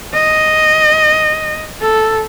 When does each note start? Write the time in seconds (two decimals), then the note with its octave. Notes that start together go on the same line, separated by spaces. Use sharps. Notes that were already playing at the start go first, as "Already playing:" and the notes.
0.14 D#5
1.81 A4